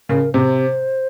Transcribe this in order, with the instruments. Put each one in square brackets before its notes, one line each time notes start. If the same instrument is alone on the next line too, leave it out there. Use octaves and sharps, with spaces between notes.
[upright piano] C#3 [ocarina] A#4
[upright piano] C3 [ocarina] C5